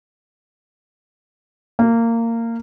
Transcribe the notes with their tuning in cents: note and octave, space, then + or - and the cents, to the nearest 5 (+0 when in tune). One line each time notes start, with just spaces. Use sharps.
A#3 -20